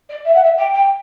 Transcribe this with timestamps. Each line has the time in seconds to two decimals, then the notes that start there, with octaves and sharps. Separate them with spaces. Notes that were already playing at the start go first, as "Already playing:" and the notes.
0.09 D5
0.25 E5
0.34 F#5
0.43 E5
0.57 G5
0.74 G5